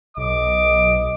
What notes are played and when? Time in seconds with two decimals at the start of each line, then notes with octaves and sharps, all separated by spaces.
0.17 B1 D#5 D6